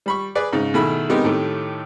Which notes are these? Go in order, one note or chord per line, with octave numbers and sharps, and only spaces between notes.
G3 B5 C#6
G#4 B4 D5
G#2 C#3
B2 D#3 A3 E4 G#4 B5
G#3 B3 C4 D#4 G4 A#4
A2 D#3 A3 G4